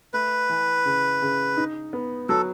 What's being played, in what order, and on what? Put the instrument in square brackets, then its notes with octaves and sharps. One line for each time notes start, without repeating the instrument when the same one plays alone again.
[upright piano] A3 [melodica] B4
[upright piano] E3
C#3
C#3
D#4
B3
[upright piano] F#3 [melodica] A4